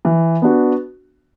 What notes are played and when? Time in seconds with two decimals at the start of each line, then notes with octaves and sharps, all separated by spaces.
0.05 E3
0.42 B3 D4 F#4